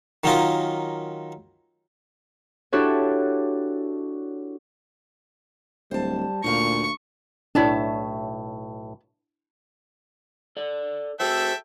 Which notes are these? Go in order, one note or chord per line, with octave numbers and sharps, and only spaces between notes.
D#3 F#3 C#4 D#4 F4 A#4
D4 E4 F#4 G4 A4 C#5
D1 G3 C5 A5
D2 A#2 D#4 F5 C#6
B1 A2 D4 E4 C#5 E5 A5
A4 D5
F#4 G#4 A4 C5 E5 G5